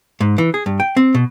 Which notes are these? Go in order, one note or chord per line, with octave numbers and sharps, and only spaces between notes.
G#2
E3
G#4
G2
G5
C4
B2